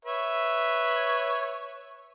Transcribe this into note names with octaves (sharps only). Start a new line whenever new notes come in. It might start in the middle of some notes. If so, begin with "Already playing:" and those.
B4 C#5 E5